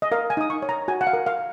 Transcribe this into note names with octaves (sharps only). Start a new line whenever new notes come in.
D#5
A#4 F5
G#5
D#4 D#6
C#6
C#5
A#5
F#4 G#5
F#5
F5
A#4
F5